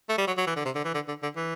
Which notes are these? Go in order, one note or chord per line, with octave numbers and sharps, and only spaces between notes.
A3
G3
F#3
F#3
E3
D3
C3
D3
E3
D3
D3
D3
E3